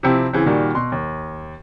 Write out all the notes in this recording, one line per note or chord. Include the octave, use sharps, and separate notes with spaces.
C3 F3 C4 E4 G4
C#3 E3 C4
A#2 D#3 G3 F#4
B2 C6
D#2